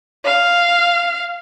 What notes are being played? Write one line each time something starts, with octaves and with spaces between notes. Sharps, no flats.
F5